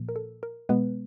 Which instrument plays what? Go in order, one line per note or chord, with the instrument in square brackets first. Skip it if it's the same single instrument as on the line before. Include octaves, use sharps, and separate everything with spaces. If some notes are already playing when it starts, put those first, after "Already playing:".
Already playing: [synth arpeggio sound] A#2 F3 A#3
A#4
A4
A#4
B2 G#3 B3 B4